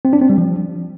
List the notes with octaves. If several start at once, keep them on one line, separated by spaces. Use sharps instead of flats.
C4
D4
C4
G3
F3